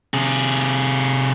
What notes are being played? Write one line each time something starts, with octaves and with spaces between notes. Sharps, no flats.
C3 G#4